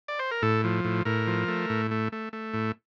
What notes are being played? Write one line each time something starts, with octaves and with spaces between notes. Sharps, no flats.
D5
C5
A#4
A2 A4
F3
A2
A2 A#4
F3
A3
A2
A3
A3
A3
A2